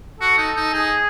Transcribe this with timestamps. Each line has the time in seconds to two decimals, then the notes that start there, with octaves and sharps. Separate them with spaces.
0.20 F#4 A4
0.38 D#4
0.56 D#4
0.73 D#4 G#4